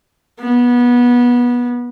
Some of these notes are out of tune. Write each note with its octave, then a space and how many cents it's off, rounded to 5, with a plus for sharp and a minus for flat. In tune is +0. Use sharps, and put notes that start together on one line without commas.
B3 -20